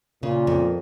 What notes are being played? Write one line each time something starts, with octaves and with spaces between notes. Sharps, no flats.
A#2 C#3
F2